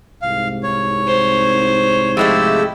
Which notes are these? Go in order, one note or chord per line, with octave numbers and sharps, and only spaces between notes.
C2 G#2 F5
C#5
C5
F3 G#3 A3 E4 G4 E6